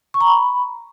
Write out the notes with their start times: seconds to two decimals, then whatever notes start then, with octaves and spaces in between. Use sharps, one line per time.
0.14 C#6
0.21 A#5
0.27 B5